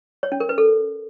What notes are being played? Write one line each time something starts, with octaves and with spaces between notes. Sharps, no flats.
C#5
C#4
A#4
B4
A4